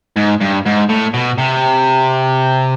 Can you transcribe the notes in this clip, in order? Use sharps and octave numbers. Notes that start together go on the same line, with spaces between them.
G#2
G2
G#2
A2
B2
C3